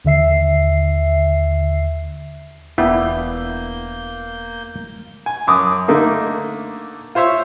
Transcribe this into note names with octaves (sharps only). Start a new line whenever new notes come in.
D#2 D3 E5 C7
E1 A#3 B3 D4 E4 E5 G6
G#5
F#2 D6 D#6
D3 A3 A#3 D#4
F4 C5 C#5 E5